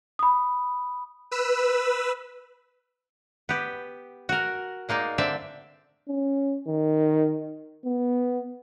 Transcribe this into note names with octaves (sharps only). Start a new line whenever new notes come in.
B5 D#6
B4 E6
B3 G4
F#4 A#4
G#3 A#3 D#4 D5
D3 C4 D5 E5
C#4
D#3
B3